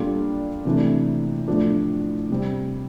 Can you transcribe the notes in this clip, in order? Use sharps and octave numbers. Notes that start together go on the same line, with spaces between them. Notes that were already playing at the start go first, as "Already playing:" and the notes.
Already playing: A#2 G3 D4 F4 A4
C3 E3 A3 D4
A2 F3 A3 D4
C3 G3 C4